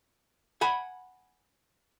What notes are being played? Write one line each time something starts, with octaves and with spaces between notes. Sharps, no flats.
F#5 G#5 B5